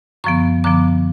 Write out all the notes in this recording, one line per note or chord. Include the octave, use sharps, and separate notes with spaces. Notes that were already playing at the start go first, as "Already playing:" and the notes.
F#2 D3 F3 B3 C#6
F#2 D3 F3 B3 D6